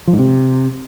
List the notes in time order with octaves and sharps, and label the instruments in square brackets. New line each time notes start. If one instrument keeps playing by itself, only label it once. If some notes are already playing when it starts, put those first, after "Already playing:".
[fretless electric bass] F3
G#2
C3